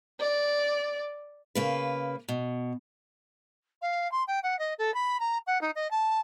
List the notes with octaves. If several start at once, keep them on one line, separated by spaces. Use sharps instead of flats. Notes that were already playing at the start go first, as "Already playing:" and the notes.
D5
C#3 A#3 B4
B2
F5
C6
G5
F#5
D#5
A4
B5
A#5
F#5
D#4
D#5
A5